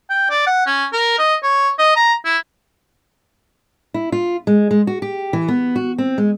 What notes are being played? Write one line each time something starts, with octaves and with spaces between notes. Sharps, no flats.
G5
D5
F#5
C#4
A#4
D#5
C#5
D#5
A#5
E4
E4
F4
G#3
G#3
F#4
G4
E3
B3
F#4
C4
G#3